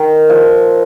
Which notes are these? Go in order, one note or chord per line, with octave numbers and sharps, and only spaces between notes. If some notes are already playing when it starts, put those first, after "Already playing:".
Already playing: D#3
F3